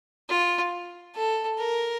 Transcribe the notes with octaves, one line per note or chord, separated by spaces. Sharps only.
F4
A4
A#4